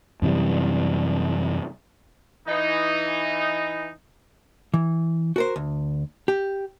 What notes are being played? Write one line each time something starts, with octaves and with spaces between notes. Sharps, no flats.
F#2 C3 E3 G3
E3 D#4
E3
F#4 A#4 C5
D2
G4